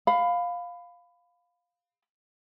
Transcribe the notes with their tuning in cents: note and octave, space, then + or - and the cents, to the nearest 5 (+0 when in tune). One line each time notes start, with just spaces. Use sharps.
F5 +10 B5 +20